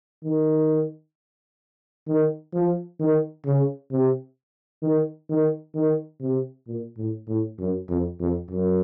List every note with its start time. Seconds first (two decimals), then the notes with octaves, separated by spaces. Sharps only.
0.24 D#3
2.08 D#3
2.54 F3
3.00 D#3
3.45 C#3
3.92 C3
4.83 D#3
5.29 D#3
5.75 D#3
6.21 C3
6.67 A#2
6.97 A2
7.28 A2
7.59 F#2
7.89 F2
8.20 F2
8.51 F#2